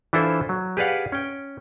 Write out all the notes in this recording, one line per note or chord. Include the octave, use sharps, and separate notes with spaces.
E3 D4 E4 F4 A4 C5
F#3
G4 G#4 B4 D5 F5 F#5
C#4 G5